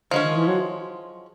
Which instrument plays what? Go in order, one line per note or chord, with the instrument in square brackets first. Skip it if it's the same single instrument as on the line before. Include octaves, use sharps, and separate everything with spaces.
[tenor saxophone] D3 [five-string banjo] F3 G#3 C#4
[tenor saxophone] D#3
E3
F#3